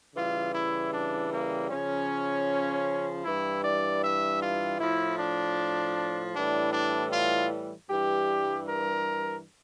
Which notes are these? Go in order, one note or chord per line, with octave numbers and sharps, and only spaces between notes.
C#3 E3 G3 F4
E4
D4
A#3
C#3 F3 C#4
G2 E3 G3 E4
D5
E5
F4
A2 F3 E4
D4
A2 E3 G3 D4
D4
F4
G2 E3 G3 G4
A#4